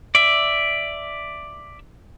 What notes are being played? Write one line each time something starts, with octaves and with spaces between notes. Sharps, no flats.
D5 E5